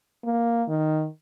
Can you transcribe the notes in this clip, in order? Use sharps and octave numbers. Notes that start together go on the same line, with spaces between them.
A#3
D#3